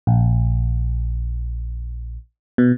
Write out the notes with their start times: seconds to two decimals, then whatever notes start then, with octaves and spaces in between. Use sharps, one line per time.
0.07 A#1
2.58 B2